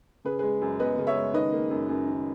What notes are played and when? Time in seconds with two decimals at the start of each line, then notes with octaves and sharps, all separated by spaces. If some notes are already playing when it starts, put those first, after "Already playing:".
0.25 C#3 G#4 B4
0.39 G#3 G#4 B4
0.62 F#2
0.79 B3 B4 D#5
0.98 C#3
1.07 C#5 E5
1.16 G#3
1.34 D#3 B4 D#5
1.52 A#3
1.70 F#2
1.89 F#2
2.06 D#3